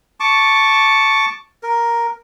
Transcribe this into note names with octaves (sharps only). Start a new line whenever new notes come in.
A5 C#6 D6
A#4